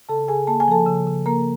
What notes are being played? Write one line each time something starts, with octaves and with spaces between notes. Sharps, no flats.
C#3 A4 A5
C#3 G#4 G#5
A#3 A5
G#5
F3 A4 A5
C#3
C#3
A#3 A#4 A#5